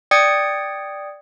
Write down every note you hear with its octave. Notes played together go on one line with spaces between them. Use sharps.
D5 G5 D#6 G#6 C#7